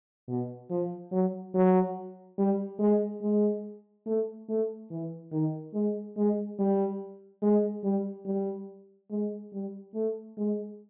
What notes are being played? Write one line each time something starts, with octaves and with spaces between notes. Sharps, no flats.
B2
F3
F#3
F#3
G3
G#3
G#3
A3
A3
E3
D#3
G#3
G#3
G3
G#3
G3
G3
G#3
G3
A3
G#3